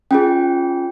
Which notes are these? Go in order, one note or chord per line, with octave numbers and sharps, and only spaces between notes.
C#4 F4 G#4 G5